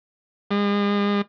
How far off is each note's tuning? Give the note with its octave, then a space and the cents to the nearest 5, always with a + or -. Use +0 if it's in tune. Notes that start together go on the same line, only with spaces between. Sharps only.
G#3 -40